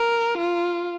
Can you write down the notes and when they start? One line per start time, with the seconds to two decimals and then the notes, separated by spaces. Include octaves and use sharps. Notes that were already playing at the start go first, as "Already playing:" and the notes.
Already playing: A#4
0.38 F4